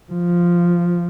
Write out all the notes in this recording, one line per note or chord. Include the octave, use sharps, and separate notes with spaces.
F3